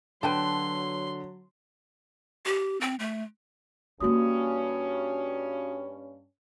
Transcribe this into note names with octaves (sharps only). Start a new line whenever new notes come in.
D3 F#3 B4 G5 A5 C6
G4
C4
A3
G2 A#3 C#4 D#4 F#4 D#6